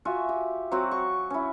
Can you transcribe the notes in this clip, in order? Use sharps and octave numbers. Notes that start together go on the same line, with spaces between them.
F4 F#4 E5 G#5
G4
F#3 C4 F#4
C#6
C#4 E4